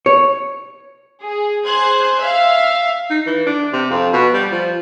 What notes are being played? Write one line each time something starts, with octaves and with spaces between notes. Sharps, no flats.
C#5
G#4
G#4 C5 F#6 G#6
E5 F5
D#4
E3
D4
C3
F2
B2
G3
F3